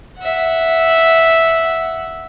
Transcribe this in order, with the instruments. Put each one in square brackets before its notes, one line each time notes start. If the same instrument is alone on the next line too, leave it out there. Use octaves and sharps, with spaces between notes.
[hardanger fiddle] E5 F#5